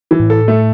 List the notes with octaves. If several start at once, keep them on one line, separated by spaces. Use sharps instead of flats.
E3
A2
A4
A3